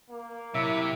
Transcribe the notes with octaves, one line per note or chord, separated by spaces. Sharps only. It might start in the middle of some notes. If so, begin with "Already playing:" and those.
A#3
C3 F#3 E4 E5